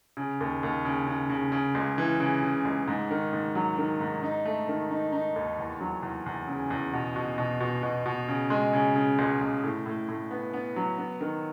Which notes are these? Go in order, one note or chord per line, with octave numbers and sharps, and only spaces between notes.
C#3
D#2
D#2
C#3
C#3
C#3
C#3
C#2
E3
C#3
C#3
C#2
G#2
D#3
G#2
F#3
D#3
G#2
D#4
A3
D#3
D#4
D#4
D#2
E2
F#3
E2
E2
C#3
E2
B2
B2
B2
B2
B2
B2
C#3
G#3
C#3
C#3
C#2
C#2
A2
A2
A2
B3
B3
F#3
B3
D#3